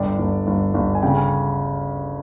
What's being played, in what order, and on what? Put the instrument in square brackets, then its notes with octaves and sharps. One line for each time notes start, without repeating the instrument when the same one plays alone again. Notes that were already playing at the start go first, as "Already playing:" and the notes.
Already playing: [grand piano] G1 D4 G5
G1
G1
G1
G#5
C#3 G5
G#5